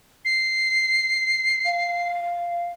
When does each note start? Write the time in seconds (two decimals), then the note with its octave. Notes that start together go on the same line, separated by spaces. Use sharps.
0.25 C7
1.65 F5